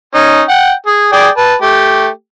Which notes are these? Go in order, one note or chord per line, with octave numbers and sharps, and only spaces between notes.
C#4 D#4
F#5 G5
G#4
G#4 D5 G5
B4 A5
A3 G4